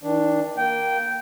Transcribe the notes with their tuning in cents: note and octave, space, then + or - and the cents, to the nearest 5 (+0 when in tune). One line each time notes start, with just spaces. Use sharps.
D#3 +45 D4 +0
A#3 +5 G5 -15